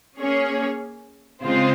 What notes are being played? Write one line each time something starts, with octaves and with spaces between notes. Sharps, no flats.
A#3 C#4 G#4 C#5
C#3 G#3 C4 F4 C5